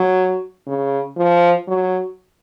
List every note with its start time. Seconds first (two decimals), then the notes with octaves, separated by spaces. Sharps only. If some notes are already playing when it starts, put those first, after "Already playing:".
Already playing: F#3
0.67 C#3
1.17 F3
1.68 F#3